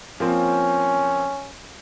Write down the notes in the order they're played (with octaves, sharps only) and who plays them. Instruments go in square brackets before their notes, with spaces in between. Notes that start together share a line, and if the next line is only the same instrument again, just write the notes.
[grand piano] F3 A#3 C4 [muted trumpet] C#4